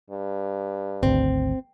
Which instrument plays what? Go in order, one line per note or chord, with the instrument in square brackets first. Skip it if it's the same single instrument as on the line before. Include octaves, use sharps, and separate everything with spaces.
[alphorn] G2
[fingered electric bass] G#1 D2 [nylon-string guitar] C4